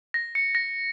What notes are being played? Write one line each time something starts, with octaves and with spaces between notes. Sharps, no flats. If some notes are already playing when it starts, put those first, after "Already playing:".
A#6
C#7
A#6